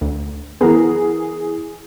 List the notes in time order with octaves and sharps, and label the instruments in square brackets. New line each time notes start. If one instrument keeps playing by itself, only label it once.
[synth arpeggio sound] D2
[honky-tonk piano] E3 G#4 [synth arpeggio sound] B3 A#4